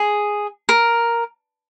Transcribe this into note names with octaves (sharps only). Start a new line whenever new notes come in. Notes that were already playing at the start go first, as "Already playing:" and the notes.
Already playing: G#4
A#4